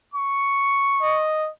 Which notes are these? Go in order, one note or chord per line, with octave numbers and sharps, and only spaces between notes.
C#6
D#5